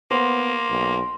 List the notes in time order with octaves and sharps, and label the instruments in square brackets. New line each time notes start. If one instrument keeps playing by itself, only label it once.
[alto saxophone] A#3 [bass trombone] B3 [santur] C5
[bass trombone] B1